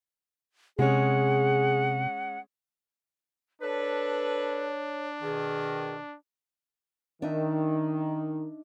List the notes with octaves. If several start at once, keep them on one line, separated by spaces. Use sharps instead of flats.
C3 G#3 C#4 G#4 F#5
D4 A4 B4 C#5
B2 D#3 G#4
D#3 D4 D#4 E5